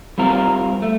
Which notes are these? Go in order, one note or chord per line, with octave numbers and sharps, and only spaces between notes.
G3 C4 F4 A#4
A3